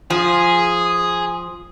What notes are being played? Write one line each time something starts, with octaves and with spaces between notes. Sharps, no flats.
F3 G#4